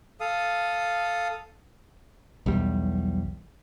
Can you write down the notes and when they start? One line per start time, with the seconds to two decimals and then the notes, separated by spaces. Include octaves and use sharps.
0.20 A4 F5 D#6
2.46 B1 E2 G3